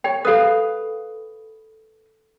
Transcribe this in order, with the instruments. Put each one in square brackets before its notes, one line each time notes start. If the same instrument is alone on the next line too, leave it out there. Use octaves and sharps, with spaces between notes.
[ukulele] C#5 [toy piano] G5
[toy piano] A4 D#6 [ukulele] B4 F5